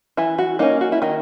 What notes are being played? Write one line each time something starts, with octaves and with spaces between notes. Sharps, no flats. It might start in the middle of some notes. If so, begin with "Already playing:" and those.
E3 E4
F#4
A#3 C#4 D#4
F#4
E4
D#3 D#4